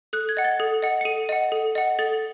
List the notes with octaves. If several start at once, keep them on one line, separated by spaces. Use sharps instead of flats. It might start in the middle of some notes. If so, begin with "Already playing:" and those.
A4 F#6
G#6
D#5 F#5
A6
A4
D#5 F#5
C#7
A4 D#7
D#5 F#5
A4
D#5 F#5
A4 A6